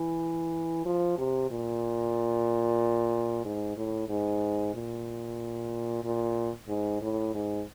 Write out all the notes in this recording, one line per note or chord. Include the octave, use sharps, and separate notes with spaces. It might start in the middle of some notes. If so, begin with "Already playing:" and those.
Already playing: E3
F3
C3
A#2
G#2
A2
G#2
A#2
A#2
G#2
A2
G#2